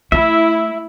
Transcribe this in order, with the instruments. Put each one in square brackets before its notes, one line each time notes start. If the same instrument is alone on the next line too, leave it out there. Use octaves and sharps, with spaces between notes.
[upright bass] A3 [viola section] E4 [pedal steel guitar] E5